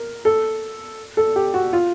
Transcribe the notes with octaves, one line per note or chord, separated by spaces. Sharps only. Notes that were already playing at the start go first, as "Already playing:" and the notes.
Already playing: A#4
A4
A4
G4
F#4
F4